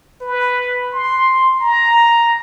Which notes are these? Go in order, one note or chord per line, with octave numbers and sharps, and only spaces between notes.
B4
C6
A#5